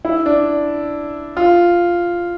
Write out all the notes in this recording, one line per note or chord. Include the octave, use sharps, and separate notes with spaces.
E4
D4
F4